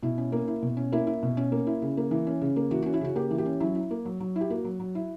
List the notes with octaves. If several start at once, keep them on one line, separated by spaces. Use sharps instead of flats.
B2 E4
C#4
A#3
E4
B2
C#4
A#3 E4
E4
B2
C#4
A#3
E4
C#3
A#3
E3
C#4
C#3
A#3
E3 F#4
C#4 F#4
E4
C#3 F#4
A#3 G4
E3
G4
C#4
F#3 E4
E4
A#3
F#3
F#3
E4
G4
A#3 F#4
F#3
F#3
E4